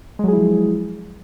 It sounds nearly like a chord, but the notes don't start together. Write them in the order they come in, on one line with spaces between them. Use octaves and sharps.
G#3 F#3 G#4 E4 F3